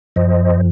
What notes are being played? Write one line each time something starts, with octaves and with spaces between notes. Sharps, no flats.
F#2 F3 C5 D#5